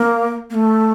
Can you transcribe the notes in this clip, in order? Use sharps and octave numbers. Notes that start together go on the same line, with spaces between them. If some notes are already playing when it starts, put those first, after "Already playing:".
Already playing: A#3
A#3
A3